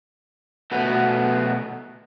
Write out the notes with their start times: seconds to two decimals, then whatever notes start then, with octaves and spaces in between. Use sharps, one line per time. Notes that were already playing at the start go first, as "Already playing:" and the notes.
0.71 B2 A3 B3 F#4